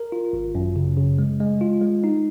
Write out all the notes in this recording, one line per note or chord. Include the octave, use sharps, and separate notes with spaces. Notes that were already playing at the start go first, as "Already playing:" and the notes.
Already playing: A#4
F4
G#1
F#2
C#3
C#3
G#3
G#3
F4
G#3
D#4